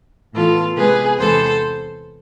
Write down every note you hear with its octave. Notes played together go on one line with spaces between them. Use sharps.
A2 E3 B3 F4 A4
C3 G#3 B3 G#4 B4
E2 C3 G#3 B3 A4 C5